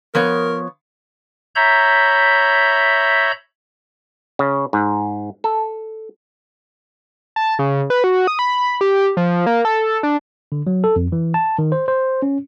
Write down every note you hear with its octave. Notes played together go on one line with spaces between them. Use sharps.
F3 B3 A#4 C#5
C#5 E5 A#5 B5 G6
C#3
G#2
A4
A5
C#3
B4
F#4
D#6
B5
G4
F3
A#3
A4
D4
D3
F#3
A4
F2
E3
A5
D#3
C5
C5
C#4